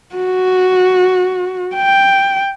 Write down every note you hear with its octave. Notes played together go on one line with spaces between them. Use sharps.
F#4
G5